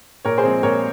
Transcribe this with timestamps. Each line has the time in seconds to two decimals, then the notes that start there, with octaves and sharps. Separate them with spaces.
0.25 A#2 A#4 C#5
0.38 G#4 C5
0.44 F3 G#3 C4
0.63 A#2 A#4 C#5